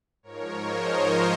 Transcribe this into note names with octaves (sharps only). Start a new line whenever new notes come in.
G#2 F3 A#4 C#5
C5 D#5
F5